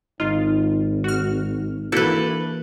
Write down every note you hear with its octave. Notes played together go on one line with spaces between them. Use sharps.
G#1 D#4 F4
F#4 F6
E3 A#3 D4 E4 F#4 A4 B4 G6